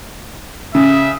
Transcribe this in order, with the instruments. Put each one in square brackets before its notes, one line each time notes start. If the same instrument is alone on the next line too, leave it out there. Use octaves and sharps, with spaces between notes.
[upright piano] C#3 [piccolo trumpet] E5